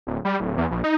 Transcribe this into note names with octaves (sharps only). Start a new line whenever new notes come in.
D1
G3
D1
E2
A#1
D#4